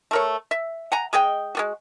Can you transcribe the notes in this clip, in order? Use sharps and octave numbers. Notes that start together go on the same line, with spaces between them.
A3 A#4 C#5
E5
F#5 G#5 A#5
G#3 G#4 D#5 G5
G#3 B3 F#4